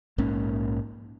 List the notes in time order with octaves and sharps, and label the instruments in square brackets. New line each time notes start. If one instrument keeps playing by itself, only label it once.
[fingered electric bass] A#1 G#2 A#3 C#4